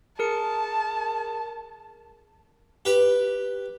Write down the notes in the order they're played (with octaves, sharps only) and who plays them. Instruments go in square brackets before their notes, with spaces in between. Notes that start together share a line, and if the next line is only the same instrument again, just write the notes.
[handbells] G#4 A#4 C#7 [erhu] A5
[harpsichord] G4 B4